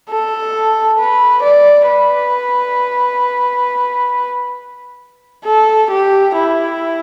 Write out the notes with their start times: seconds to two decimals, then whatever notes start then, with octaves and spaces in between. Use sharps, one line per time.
0.10 A4
0.99 B4
1.43 D5
1.88 B4
5.45 A4
5.91 G4
6.36 E4